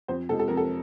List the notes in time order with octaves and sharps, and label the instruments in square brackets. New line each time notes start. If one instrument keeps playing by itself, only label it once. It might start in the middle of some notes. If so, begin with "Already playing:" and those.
[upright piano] F2 C5
C3 F3 G#3 A4
A4
F2 A#4
A4